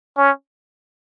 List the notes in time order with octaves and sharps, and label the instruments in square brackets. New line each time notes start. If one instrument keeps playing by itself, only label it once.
[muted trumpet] C#4